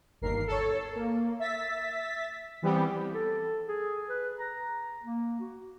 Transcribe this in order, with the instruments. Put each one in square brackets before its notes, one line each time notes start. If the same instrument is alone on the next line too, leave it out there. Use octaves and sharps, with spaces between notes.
[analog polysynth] G1 D#2 A#4 C7
A4 C#5
A#3
E5 A6 B6
E3 G3 B3 C4 G4
[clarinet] A4
G#4
B4
A#5
A#3
F#4